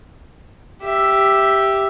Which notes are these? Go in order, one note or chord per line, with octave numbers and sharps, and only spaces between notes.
G4 E5